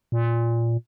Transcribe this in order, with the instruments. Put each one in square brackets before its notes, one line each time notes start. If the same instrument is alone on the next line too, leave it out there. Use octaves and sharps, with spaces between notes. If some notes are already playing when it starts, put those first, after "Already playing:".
[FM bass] A#2